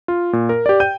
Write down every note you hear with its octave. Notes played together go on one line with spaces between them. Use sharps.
F4
A#2
A#4
G4 D5
G5 G6 D#7